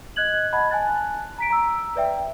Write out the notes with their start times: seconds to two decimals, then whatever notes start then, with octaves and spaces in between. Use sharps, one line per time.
0.16 D#5 F#6 G#6 F#7
0.53 D#5 F#5 A5 B5 G#6
0.71 G#5 A5 F#6 A6
1.39 A#5 B6 D7
1.50 A#5 E6
1.96 B4 D5 E5 G5